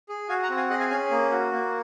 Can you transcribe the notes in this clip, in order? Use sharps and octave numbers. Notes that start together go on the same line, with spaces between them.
G#4
F#4 F5 G#5
F#5 A#5
C4
F5 G#5
G#4 D#5 F#5
F5 G#5
C#4 F5 G#5
A#3
F#4
A#3